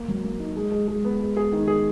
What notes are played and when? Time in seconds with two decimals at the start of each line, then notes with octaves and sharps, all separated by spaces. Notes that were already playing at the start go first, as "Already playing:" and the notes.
Already playing: A#3
0.08 F#3
0.24 A#3
0.40 D#4
0.57 G#3
0.71 G#3
0.88 G#3
1.05 B3
1.20 G#3
1.37 G#4
1.52 D#3
1.68 G#4